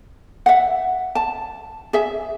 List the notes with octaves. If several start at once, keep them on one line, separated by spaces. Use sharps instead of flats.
E5 F#5
A5
G#4 E5